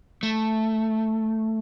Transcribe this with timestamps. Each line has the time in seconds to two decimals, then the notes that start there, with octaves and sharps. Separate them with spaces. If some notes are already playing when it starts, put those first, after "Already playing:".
0.23 A3